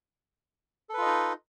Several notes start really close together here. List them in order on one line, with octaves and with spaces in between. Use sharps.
A4 B4 F4 D#5 D#4